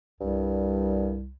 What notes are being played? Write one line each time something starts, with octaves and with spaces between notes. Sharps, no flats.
C2 G2